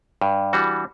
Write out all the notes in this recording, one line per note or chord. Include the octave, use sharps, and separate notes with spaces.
G2
E3 G3 D4 F#4